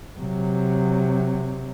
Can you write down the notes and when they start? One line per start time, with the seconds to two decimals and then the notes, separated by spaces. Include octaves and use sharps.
0.18 C3 F#3